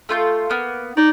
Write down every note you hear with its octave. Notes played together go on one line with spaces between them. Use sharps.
A3 F4 G6
A#3 B3
D#4 D5